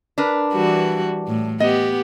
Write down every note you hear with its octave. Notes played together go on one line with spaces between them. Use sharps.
D4 A#4 B4
E3 G3 F#4
A2
B3 G4 D#5